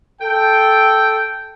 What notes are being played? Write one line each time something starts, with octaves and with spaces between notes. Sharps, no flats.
A4 G5